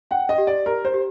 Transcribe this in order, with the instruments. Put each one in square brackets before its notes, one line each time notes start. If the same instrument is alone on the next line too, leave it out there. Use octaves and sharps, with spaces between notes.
[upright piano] F#5 [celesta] G5
[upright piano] D#5
[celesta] G4
[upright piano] D5
[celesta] G4 [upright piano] A#4
[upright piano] C5
[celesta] G4